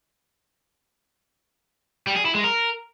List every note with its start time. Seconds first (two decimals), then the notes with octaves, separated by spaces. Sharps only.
2.07 G3
2.16 G#4
2.25 E4
2.35 G#3
2.44 A#4